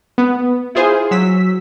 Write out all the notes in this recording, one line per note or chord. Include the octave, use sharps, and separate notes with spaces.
B3
E4 F4 G#4 C5
F#3 E6 B6